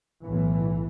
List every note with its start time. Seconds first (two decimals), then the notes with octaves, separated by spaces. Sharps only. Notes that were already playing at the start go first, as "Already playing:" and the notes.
0.21 B1 A2 E3